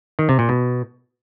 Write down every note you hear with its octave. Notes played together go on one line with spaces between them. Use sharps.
D#3
C3
A#2
B2